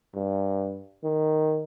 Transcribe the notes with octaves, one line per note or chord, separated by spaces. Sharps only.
G2
D#3